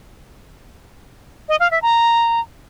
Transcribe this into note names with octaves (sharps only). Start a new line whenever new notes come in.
D#5
F5
E5
A#5